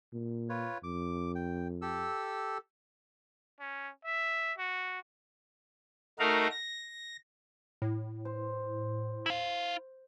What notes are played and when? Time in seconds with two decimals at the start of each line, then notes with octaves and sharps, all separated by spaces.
0.12 A#2
0.49 F4 B4 C#5
0.83 F2 D6
1.35 G5
1.82 G4 A4 E6
3.60 C#4
4.05 E5
4.58 F#4
6.19 A3 D#4 F#4 A#4 F5
6.51 A#6
7.82 A2
8.25 C5
9.26 E4 F5